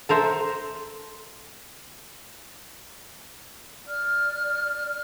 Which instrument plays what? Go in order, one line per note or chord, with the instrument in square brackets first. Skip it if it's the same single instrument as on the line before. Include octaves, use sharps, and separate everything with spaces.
[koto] A4 A#4 C5 E5
[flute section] D5 F6